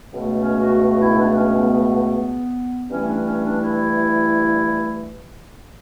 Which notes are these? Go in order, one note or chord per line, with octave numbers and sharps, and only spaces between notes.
C#2 B2 A3
C#4
F#4
F#4
E4
D4
C#4
B3
G2 E3 A3 C#4
D4
C#4
D4
E4